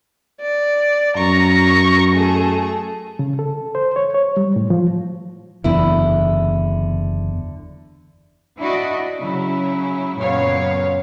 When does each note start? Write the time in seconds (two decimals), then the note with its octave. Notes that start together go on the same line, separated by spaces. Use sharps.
0.41 D5
1.16 F#2 A#5 C#6
2.14 A3 G#4
3.19 C#3
3.39 A4
3.75 C5
3.96 C#5
4.15 C#5
4.37 G3
4.56 A2
4.70 F3
5.64 F#1 E2 D3 E4
8.58 D4 E4 F#4 D5 D#5
9.18 C#3 F#3 C#4 E4
10.16 F#2 A#2 C#3 B3 C#5 F5